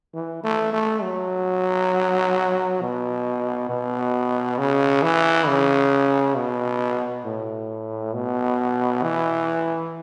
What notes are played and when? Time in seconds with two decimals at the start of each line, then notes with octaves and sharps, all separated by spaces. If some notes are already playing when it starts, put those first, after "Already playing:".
0.14 E3
0.44 A3
0.73 A3
1.03 F#3
2.81 B2
3.69 B2
4.58 C#3
5.03 E3
5.47 C#3
6.36 B2
7.25 A2
8.14 B2
9.03 E3